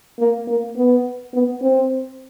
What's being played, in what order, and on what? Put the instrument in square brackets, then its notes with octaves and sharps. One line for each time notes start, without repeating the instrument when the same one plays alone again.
[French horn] A#3
A#3
B3
B3
C4